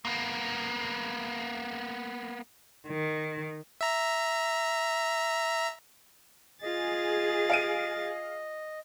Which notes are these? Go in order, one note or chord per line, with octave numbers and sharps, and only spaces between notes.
A#3 B3
D#3
E5 A#5
F4 G#4 D#5 A6
F5 D7 D#7